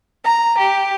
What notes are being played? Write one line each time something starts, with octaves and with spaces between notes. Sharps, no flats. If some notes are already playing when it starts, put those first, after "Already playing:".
A#5
G4